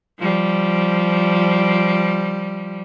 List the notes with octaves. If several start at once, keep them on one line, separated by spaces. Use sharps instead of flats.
F3 G3